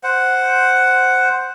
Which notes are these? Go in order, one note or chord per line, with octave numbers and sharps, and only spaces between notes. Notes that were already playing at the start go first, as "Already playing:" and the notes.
C5 F#5